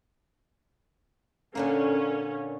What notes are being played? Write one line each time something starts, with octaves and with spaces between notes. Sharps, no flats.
A#2 D3 A#3 C#4